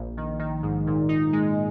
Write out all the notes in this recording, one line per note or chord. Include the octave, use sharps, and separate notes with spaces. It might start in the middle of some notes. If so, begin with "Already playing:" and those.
Already playing: A#1
D#3
D#3
G#2
A#2
D#4
G#3